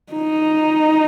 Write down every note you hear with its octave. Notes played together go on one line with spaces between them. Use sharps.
D#4